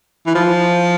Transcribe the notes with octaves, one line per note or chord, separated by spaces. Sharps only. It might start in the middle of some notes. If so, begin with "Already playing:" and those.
E3
F3